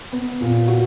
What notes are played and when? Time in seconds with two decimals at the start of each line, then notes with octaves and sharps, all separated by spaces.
0.13 B3
0.41 A#2
0.68 F#4